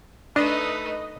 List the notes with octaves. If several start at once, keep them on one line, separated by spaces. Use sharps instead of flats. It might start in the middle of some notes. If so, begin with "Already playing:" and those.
A3 D4 D#4 B4 D#5